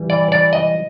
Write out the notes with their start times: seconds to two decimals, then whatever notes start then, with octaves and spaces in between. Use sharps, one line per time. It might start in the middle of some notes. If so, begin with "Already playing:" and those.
Already playing: E3 G3
0.10 D5
0.32 D5
0.53 D#5